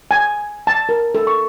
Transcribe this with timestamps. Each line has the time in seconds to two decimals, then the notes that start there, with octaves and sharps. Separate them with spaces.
0.11 G#5
0.67 A5
0.89 A#4
1.15 A4
1.27 C#6